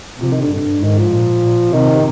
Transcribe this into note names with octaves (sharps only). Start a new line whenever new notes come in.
C3 F3
D#3
D3
G2 D3
G#2 D#3
F3
A#2
A#2
C3 D#3